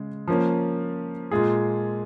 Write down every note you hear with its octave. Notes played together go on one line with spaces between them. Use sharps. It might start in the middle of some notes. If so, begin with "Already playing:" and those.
Already playing: C#3 G#3
F3 A#3 C#4
A#2 G#3 F4 G#4